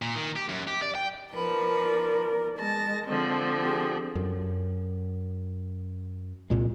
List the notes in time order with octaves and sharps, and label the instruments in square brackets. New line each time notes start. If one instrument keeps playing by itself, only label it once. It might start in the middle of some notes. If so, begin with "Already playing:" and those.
[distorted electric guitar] A#2
D#3
G4
F#2
G4
D5
G5
[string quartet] F3 B4 [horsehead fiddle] A#4 D5
[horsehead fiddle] G#3 [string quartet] A5 A6 A#6
[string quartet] D3 F3 C4
[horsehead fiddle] G4 G#4
[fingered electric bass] F#2
C2 A#2 G#3